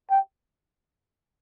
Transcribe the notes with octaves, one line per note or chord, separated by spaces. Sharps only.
G5